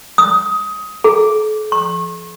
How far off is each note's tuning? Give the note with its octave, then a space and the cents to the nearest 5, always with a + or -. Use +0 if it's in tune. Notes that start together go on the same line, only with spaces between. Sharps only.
D#6 +20
A4 -45
C#6 -40